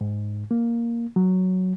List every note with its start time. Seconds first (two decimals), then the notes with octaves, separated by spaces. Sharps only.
0.01 G#2
0.51 A#3
1.16 F#3